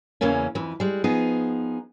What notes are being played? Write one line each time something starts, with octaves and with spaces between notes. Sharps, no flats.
E2 C#3 E3 A#3 C#4
F2 E3
G3 G#3
F3 B3 D#4 G#4